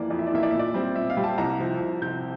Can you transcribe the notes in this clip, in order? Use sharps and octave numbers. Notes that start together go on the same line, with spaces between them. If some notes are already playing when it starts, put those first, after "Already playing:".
Already playing: F2 E3 A#3 D5
F2 D5
E5
D5
E3 A#3 E5
D5
A#2 E5
D5
G3 C4
A#2 E5
F5
G3 C4
A5
C2 A#5
C3 F3 C4
C2
C3 F3 C4 G6